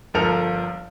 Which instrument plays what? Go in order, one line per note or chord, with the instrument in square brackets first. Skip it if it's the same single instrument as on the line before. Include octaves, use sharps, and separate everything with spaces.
[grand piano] G1 F3 A4 A#4 F7